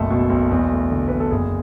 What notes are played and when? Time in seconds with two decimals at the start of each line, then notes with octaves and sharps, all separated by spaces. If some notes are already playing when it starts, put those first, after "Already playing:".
Already playing: F#1 B1 A3 A4
0.10 B2
0.30 B1
0.51 E2
0.70 A3
0.91 D3
1.08 E2 B4
1.20 A4
1.31 F#1 G#4